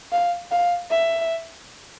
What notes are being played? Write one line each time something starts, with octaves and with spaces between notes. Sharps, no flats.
F5
F5
E5